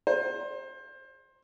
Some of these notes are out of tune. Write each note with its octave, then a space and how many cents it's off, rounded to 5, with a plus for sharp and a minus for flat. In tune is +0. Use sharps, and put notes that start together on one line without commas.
C5 +25